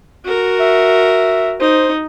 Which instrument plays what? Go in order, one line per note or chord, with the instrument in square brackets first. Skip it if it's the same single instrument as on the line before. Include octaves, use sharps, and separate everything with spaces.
[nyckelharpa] F#4 A#4
[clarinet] E5
[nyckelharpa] D#4 [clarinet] C5